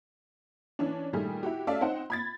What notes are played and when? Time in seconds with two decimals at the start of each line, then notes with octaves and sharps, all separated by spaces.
0.79 E3 C#4 D4
1.13 A#2 D#3 G3 A3 G#4
1.43 E4 F#4 G4
1.67 A3 C#4 D5 E5 F5 A5
1.81 C4 D#4 C5 F#5
2.10 B5 G#6 A6